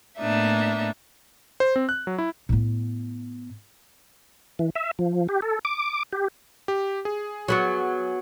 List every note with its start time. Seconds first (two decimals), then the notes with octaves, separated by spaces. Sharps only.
0.19 A2 A#3 B3 D4 D#4 E5
1.60 C5
1.76 C4
1.89 F#6
2.07 F#3
2.18 E4
2.49 A2 B3
4.59 E3
4.75 E5
4.99 F3
5.29 G4
5.42 A4
5.65 D6
6.13 G4
6.68 G4
7.05 G#4
7.48 F#3 B3 F#4